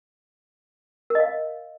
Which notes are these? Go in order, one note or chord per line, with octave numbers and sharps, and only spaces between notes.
A#4 D#5 F5